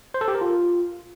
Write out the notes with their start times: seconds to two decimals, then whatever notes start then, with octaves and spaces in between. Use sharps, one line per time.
0.14 C5
0.21 A4
0.28 G4
0.35 A#4
0.41 F4